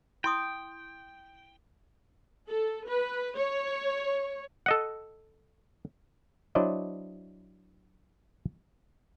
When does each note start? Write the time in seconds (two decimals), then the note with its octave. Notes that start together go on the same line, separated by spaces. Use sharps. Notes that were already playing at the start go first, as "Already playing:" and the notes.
0.24 E4 G5 C6 D#6
2.48 A4
2.88 B4
3.36 C#5
4.66 A4 D#5 F#5
6.55 F#3 D4 E4 C5 D5 D#5